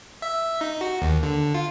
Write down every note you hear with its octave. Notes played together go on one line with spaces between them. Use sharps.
E5
D#4
F#4
D#2
D3
F4